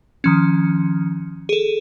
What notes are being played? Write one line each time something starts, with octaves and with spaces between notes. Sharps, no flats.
D#3 F3 C#4
G#4 A4